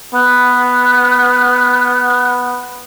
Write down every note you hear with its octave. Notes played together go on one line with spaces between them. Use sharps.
B3 F#6